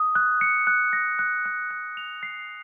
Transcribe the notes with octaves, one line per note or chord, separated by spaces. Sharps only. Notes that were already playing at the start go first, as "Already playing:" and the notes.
Already playing: D#6
F#6
C#7
F#6
A#6
F#6
F#6
F#6
F7
C7